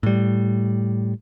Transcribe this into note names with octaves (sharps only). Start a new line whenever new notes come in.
A2 G3